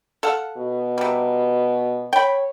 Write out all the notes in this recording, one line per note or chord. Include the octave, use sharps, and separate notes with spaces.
A4 F5 F#5
B2
C3 G3
C#5 G5 B5